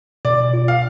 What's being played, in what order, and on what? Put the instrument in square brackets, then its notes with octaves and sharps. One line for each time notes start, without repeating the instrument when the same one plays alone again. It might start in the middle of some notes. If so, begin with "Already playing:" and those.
[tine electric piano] B2 [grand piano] D5
[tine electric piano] F4
[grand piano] F5